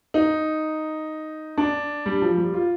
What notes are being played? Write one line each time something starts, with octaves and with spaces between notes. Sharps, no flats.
D#4
D4
G3
F3
G3
F4